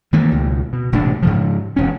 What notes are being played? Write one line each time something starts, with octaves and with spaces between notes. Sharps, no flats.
D#3 E3 A3 A#3
C#2 B2
B2
E1 A2 C3 D4
G#2 C#3 F3
E1 C#4